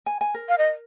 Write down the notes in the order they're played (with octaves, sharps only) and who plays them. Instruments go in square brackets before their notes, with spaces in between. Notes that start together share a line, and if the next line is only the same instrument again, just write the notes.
[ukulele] G#5
G#5
A#4
[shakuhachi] F5
D#5